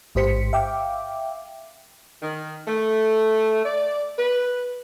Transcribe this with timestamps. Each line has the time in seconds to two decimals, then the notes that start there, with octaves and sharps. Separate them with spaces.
0.15 A1 G#2 G4 C5 B6 C#7
0.53 E5 F5 G5 D6
2.22 D#3
2.68 A3
3.66 D5
4.18 B4